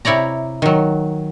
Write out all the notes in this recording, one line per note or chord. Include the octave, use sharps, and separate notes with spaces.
C3 E4 C#5 D5 A#5
D#3 F#3